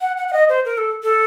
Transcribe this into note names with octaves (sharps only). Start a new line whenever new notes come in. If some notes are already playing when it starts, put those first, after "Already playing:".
F#5
F#5
F#5
D#5
C5
A#4
A4
A4